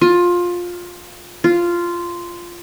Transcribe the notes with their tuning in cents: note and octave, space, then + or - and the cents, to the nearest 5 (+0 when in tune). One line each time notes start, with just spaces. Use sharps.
F4 +15
F4 -10